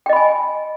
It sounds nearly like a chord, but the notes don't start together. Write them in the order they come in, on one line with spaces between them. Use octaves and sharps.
G5 D#5 B5 G#5